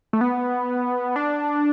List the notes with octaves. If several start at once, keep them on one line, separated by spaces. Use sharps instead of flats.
A3
B3
D4